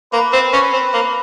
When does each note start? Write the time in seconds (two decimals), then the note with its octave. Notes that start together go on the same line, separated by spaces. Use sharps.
0.13 A#3 B4
0.33 C4
0.53 C#4 B4
0.73 C4
0.94 A#3